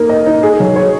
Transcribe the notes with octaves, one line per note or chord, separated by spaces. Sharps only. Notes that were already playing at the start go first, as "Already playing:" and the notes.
Already playing: A#3 D#4 A#4
D#5
D#4
G#4
F#3
C#5